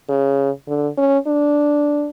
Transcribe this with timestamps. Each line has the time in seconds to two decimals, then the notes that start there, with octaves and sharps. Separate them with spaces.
0.09 C#3
0.68 D3
0.97 C#4
1.27 D4